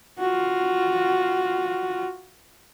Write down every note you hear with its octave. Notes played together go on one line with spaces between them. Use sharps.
F4 F#4